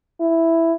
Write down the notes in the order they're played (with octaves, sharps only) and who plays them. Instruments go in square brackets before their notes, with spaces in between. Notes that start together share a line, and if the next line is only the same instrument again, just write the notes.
[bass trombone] E4